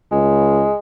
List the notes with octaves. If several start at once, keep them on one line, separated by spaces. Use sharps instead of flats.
C#2 G#3